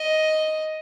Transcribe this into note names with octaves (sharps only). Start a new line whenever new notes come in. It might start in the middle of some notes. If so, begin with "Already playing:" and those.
Already playing: D#5